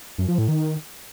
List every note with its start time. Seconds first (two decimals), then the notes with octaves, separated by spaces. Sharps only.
0.18 F#2
0.28 F3
0.38 A2
0.48 D#3